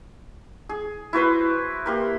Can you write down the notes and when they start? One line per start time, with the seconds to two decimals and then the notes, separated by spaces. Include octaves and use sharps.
0.69 G#4
1.13 E4 F#4 B4 C5
1.86 A#3 G4 C5